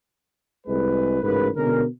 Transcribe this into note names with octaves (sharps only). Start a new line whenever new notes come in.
C2 G#3 B4
A1 G#2 C#3 F#4 A#4 B4
B2 D3 G#3 C#4 A#4